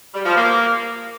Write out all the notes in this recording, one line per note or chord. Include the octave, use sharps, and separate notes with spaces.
G3
F3
A#3